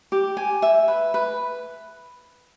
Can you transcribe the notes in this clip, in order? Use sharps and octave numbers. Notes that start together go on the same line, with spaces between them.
G4
G#5
E5
B4
B4